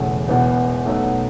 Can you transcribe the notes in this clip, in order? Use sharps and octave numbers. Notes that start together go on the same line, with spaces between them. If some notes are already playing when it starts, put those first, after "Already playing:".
Already playing: E1 E2 C#3 F#3 A3
E1 E2 B2 B3
B1 B2 F#3 A3